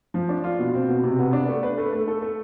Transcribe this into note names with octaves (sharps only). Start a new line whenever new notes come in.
F3
D4
F4
B2
C4
B2
C3
B3
D4
A3
B4
A3
A3
A4
A3